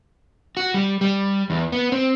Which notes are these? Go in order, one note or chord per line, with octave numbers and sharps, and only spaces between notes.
F#4
G3
G3
E2
B3
C4